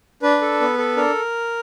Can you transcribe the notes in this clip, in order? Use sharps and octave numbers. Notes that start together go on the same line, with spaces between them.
D4 B4
A4
B3
A4
D4 A#4